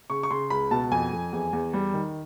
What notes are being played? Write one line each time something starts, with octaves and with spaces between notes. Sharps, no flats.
C#3 C#6
C#6
C#3 C6
C#2 B5
B2 A5
F2 G#5
F2
E2
E2
G3
D#3